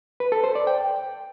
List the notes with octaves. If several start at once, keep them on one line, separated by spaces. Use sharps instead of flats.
B4
A4
C5
D5
G5